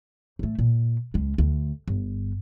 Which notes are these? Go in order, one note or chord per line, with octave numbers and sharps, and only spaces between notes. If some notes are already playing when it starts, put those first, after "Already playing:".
A2 A3
A#2
C#2 G#3
D2
G1